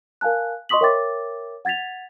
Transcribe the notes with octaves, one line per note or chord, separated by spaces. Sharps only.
A#4 F5 G#5 A5 F#6
D#5 C6 C#6 D#6 B6 F#7
A#4 C#5 E5 G5 D6 A6
F#5 G#6 A6 B6 F7